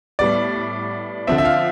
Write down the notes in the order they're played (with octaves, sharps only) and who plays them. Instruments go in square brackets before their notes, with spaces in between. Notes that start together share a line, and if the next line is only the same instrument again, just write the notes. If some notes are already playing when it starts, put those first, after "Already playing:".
[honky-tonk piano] A2 G3 B3 [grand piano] D5
[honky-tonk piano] D3 F3 C4 [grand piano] E5
[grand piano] E5
F5